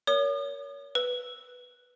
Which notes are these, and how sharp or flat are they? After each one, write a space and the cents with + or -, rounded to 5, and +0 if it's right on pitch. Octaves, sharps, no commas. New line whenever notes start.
A#4 +0 C#5 +30 D#6 -40
B4 +0 E6 -5